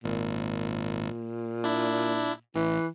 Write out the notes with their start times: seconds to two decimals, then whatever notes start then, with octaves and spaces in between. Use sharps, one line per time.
0.04 G#1 A#2
1.64 D4 E4
2.56 A1 E3